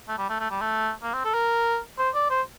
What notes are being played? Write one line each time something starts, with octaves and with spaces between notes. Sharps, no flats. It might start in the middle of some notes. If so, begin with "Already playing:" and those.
A3
G3
A3
A3
G3
A3
A#3
C4
A4
A#4
C5
D5
C5